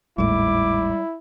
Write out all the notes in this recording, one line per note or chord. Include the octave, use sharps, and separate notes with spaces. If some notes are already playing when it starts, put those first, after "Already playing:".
G#1 D#2 A2 G3 G#3 E4 D6